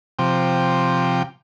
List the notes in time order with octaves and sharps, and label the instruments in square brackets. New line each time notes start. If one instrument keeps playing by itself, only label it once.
[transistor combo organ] C3 F3 G5